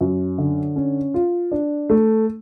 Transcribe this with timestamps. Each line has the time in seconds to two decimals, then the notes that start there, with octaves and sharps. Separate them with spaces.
0.01 F#2
0.38 D3
0.76 C#4
1.14 F4
1.52 D4
1.90 A3